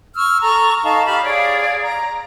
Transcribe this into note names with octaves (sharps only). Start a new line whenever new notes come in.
C#6 E6 F6
A4 A#5 C#6
D#4 A4 F5 A5
G4 F5 B5 F6
G#4 C#5 D5 F5
A#5